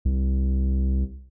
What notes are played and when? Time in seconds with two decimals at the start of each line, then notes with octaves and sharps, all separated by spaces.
0.05 C2